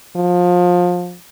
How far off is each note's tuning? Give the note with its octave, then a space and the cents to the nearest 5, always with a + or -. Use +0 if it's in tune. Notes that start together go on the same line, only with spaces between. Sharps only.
F3 +25